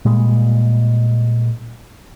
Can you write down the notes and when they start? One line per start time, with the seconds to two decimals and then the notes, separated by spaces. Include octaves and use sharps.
0.05 A#2 G3 G#3